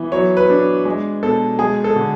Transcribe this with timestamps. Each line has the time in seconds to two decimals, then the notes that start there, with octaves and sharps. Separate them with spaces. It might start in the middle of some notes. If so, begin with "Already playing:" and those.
Already playing: E3 B3
0.12 F#3 C#5
0.37 B4
0.50 D4
0.85 G#3
1.23 B2 A4
1.59 G#3 G#4
1.84 A4
1.96 D3